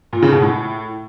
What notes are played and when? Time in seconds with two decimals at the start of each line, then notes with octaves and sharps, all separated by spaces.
0.13 A#2
0.22 C#3
0.32 B2
0.42 A2